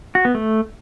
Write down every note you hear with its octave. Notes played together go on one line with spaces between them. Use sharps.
F#4
B3
A3